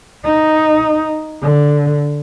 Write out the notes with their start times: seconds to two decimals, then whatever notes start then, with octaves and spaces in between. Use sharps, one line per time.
0.25 D#4
1.41 D3